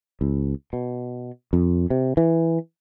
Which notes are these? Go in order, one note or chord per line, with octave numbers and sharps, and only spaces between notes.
C#2
B2
F2
C3
E3